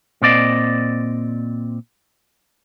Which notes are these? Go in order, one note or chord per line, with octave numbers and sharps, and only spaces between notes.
A#2 C4 D5 D#5